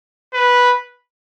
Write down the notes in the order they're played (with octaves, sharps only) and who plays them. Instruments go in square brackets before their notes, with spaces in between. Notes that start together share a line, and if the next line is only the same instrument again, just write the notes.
[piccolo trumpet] B4